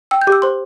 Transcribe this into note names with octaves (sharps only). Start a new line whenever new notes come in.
G5 E6
G6
G4 D6
E6
C5 C6